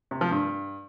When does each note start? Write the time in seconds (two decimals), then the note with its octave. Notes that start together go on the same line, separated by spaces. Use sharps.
0.11 C3
0.21 F3
0.31 G2